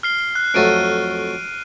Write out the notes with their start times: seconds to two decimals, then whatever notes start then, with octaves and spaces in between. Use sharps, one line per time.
0.03 F6 C7 G7
0.35 F#6
0.54 F2 F#3 A3 D7 D#7